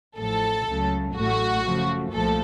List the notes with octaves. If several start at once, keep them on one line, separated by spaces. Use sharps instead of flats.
A1 A2 F3 A4
C#2 C#3 F#3 A3
A1 A2 A3 F#4
F#2 C#3 F3 A3
C2 A#2 F3 A3 A4